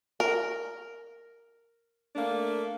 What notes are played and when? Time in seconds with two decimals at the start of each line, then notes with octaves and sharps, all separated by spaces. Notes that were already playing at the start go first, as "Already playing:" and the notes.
0.20 A#4
2.16 A3 A#3 D4